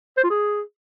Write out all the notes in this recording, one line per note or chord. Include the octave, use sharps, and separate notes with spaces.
C5
F4
G#4